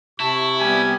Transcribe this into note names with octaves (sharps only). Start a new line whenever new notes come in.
C3 E4 A5 C#6
G3 B3 G4 G#5